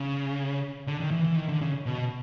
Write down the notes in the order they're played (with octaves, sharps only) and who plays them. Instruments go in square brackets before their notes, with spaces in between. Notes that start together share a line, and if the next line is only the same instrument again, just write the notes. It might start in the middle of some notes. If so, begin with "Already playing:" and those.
Already playing: [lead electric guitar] C#3
D3
D#3
E3
E3
D#3
D3
C#3
B2